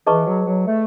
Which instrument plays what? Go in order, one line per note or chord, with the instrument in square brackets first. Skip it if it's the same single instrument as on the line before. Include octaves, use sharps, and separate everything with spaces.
[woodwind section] E3 [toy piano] G#4 B4 D#5 A5 C#6
[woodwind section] F#3
F#3
A3